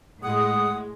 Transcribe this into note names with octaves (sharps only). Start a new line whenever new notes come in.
A2 G#3 F#5 D#6